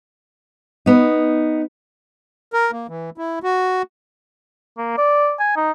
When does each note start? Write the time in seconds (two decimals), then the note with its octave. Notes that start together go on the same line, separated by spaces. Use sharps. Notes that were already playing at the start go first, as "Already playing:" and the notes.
0.86 B3 D#4
2.53 A#4
2.72 A#3
2.88 E3
3.18 E4
3.43 F#4
4.78 A#3
4.98 D5
5.40 G#5
5.56 D#4